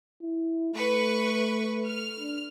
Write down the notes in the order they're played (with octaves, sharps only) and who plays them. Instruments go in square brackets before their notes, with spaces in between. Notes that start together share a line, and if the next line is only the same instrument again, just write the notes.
[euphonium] E4
[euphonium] A3 [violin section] B4 C#6
[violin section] F6
[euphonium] D4